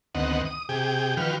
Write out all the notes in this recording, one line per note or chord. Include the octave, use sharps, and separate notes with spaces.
D2 D#3 B3 C4 D#5 F#5
D#6
C3 G4 G#4 G5
D#3 F3 F#4 B4 G5 F6